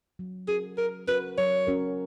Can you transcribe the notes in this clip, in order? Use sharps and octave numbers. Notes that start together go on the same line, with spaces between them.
F#3
C#4 F#4 G#4 A#4
F#3 A#4
C#4 F#4 A#4 B4
F#3 C#5
C#4 F#4 A#4